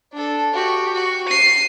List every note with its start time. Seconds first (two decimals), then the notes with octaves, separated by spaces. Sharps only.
0.13 D4 A4
0.54 F#4 G4
0.94 F#4
1.29 C7 D#7